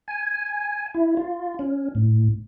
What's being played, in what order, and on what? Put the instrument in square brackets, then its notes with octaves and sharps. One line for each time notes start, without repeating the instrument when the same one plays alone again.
[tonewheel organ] G#5
E4
F4
C#4
A2